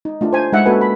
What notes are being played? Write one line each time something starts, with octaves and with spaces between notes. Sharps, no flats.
D#4
A3 D4 F4
C5 G#5
G#3 D#4 E5 F#5
A#3 C#4 F#4 A4 B4 G#5
B5